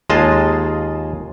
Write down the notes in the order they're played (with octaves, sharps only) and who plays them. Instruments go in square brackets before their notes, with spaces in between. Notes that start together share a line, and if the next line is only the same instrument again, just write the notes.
[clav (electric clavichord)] D#2 G#3 F4 G#4 D#5 A5